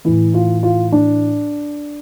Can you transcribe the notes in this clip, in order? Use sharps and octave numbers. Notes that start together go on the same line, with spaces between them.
A2 E3 E4
F4
F4
D4